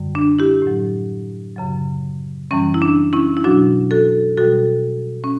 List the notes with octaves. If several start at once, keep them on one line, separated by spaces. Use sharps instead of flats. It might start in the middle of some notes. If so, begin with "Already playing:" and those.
Already playing: F#2 D3 G3
D4
E4 G4
A2 F#3
F#2 C#3 F#3
F#2 E3 G3 C#4
E4
D4
C#4 E4
E4
B2 F#3 D4 F#4
F#4 A4
B2 G3 F#4 A4
C#4